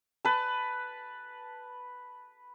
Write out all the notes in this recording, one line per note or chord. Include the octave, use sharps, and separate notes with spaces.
B4 A5